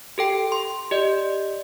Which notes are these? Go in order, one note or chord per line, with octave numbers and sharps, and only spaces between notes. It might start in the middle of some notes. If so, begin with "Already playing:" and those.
G4 A4 G5
C6
G4 D5 D#5